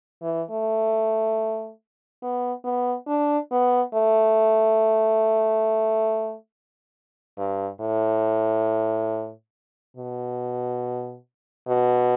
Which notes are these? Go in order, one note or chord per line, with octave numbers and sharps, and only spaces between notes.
E3
A3
B3
B3
D4
B3
A3
G2
A2
B2
B2